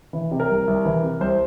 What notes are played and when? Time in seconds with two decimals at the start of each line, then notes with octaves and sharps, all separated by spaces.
0.13 E3
0.31 C3
0.40 A#4
0.50 C2
0.67 C2
0.85 E3
1.03 C3
1.20 C2 C5